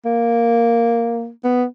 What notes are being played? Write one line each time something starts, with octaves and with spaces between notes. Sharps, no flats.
A#3
B3